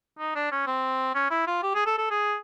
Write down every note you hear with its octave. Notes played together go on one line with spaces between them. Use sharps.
D#4
D4
C#4
C4
C#4
E4
F4
G4
G#4
A4
A4
G#4